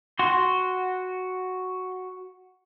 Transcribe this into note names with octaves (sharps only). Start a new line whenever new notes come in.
F#4 C6